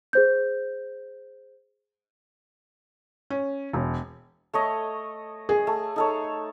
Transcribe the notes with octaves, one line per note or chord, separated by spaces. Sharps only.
G#4 C5 G6
C#4
E1
A3 C#5 D#5
G#4
A3
D#4 A4 C#5